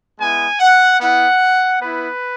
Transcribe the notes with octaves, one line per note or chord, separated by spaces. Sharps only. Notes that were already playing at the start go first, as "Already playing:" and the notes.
G#3 B3 E4 G#5
F#5
B3 E4 F#5
B3 E4 B4